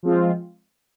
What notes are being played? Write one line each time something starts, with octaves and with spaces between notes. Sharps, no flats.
F3 G#3 C4 F4